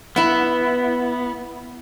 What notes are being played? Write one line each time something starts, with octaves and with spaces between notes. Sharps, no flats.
B3 E4 F#5